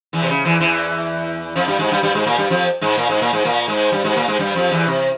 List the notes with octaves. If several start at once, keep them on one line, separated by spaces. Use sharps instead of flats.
E2 E3
C3
C#3
E2 E3
E2 E3
F2 F3
G2 G3
G#2 G#3
G2 G3
G2 G3
G#2 G#3
A#2 A#3
G2 G3
F2 F3
G#2 G#3
A#2 A#3
G#2 G#3
A#2 A#3
G#2 G#3
A#2 A#3
G#2 G#3
G2 G3
G#2 G#3
A#2 A#3
G#2 G#3
G2 G3
F2 F3
E2 E3
C3